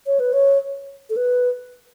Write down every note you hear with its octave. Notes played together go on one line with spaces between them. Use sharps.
C#5
B4
C#5
A4
B4